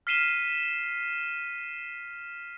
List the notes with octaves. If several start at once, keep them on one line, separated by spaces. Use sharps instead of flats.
F6 B6 C7 D#7 E7 G7